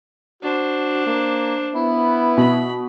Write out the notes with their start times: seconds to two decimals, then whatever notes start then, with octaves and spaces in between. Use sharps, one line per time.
0.43 D4 F#4 C5
1.06 A#3
1.75 B3 E4
2.37 B2 B5